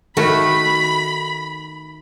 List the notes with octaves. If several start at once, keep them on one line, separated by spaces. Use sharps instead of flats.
D#3 A3 F#4 B5